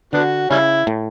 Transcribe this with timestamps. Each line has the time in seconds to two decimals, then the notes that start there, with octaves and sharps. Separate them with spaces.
0.13 D3 B3 D4 F#4
0.50 C#3 G3 C#4 E4
0.87 A2